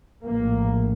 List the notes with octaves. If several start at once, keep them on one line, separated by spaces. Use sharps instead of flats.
A#1 A2 A#3